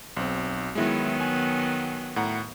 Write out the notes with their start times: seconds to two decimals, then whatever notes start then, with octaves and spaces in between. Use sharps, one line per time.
0.17 B1 C4
0.75 D#3 F#3 G#3 B3 E4
1.20 G#5
2.16 A2 F#5 A#5